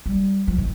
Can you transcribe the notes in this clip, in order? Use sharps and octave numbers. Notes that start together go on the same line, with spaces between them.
G3
F3
D#3